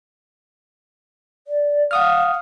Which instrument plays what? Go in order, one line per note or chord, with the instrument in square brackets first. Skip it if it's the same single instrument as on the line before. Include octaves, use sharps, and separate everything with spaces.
[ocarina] D5
[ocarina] F5 [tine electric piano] F#5 D#6 F6